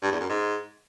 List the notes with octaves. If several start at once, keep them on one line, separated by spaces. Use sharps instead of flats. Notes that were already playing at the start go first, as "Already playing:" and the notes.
G2
E2
F#2
G#2